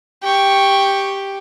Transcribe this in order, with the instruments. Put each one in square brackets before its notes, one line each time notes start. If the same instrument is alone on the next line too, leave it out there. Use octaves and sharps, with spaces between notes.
[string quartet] G4 [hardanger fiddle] G5 C#6